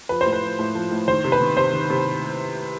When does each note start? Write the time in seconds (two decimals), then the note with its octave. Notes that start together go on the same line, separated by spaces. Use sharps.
0.09 F3 B4
0.21 C5
0.26 A2
0.33 B4
0.42 F3
0.59 A2
0.75 F3
0.91 A2
1.08 D#3 C5
1.24 C3
1.32 B4
1.41 D#3
1.57 C3 C5
1.73 D#3
1.90 C3